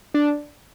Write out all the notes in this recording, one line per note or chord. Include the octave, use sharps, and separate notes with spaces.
D4